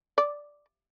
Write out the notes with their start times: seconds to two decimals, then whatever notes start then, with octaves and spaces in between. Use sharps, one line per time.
0.18 D5